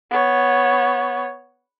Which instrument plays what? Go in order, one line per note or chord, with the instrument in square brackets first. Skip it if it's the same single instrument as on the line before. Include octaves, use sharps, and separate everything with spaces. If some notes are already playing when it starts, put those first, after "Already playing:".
[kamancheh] B3 C#5